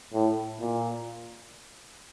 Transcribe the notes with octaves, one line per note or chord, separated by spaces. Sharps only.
A2
A#2